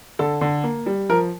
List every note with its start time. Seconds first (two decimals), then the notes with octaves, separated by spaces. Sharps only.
0.19 D3 A4
0.41 D3
0.64 A#3
0.86 G3
1.09 F3 A#4